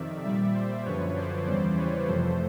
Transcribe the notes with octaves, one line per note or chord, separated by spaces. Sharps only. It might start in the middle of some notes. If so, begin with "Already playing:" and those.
Already playing: F2 C3 D#3 D5 E5
A#2 G3 D5 E5
C5
F#2 D3 F3 B4 C#5
C5 D5
E2 C#3 E3 G3 C5 D5
B4 C#5
F2 C3 F3 A3 C5